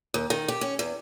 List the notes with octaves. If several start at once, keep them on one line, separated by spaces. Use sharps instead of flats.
D#2
D#3
G4
C#4
E2